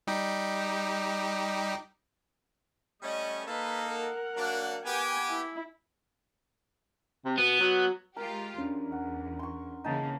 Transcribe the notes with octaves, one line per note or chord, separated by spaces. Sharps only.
G3 D#4 G4
G3 A3 C#4 D#5
A#3 D#4 A4 B4
A#4 F#5
F#3 A#3 D4
B3 G4 G#5
E4
C3
B2 B3
F#3
G#3 F4 G4 A#4 A#5
E2 C#4 D4
F#5
C6 C#6
C#3 E3 A#3 D#4 A5